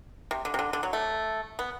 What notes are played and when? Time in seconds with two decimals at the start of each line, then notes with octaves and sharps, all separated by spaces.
0.31 C3
0.45 D3
0.54 C3
0.59 D3
0.73 D3
0.83 F#3
0.93 A3
1.59 B3